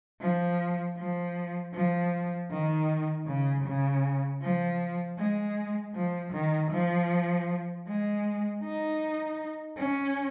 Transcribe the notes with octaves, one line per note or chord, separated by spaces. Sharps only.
F3
F3
F3
D#3
C#3
C#3
F3
G#3
F3
D#3
F3
G#3
D#4
C#4